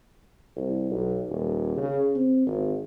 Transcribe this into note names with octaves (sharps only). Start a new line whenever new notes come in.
C2
B1
D#1
C#3
C4
G#1